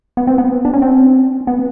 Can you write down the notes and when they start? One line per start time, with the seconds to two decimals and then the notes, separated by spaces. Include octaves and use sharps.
0.17 B3
0.27 C4
0.38 B3
0.65 D4
0.73 C#4
0.82 C4
1.47 B3